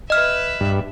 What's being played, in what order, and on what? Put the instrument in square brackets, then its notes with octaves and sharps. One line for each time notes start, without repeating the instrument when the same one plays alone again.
[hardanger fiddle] B4 E5 [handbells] D#5 F6
[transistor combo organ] G2